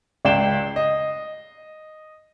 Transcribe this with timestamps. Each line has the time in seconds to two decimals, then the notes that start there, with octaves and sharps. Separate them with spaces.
0.25 C#2 D5 G5 C7 E7 G7
0.76 D#5